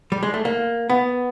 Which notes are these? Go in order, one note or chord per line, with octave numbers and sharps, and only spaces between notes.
G3
G#3
A3
A#3
B3